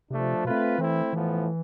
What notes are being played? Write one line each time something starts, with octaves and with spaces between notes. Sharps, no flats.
C3 F3 A3 D4
B2 A3 C4 F4 B4
E3 A3 C4 E4
A2 E3 F3 B3